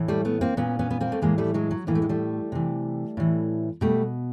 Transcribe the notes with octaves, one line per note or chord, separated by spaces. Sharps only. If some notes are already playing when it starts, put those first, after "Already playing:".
Already playing: A2 E3
G3 A3
A3 B3
A#3 C4
A#2 B3 C#4
B3 C#4
B3
A#3 C4
A3
A2 E3 G#3 A#3
G3 A3
F#3 G#3
F#3
A2 E3 A#3
A3
G#3
G3 A3
C3 E3
A2 E3
B2 G3 A3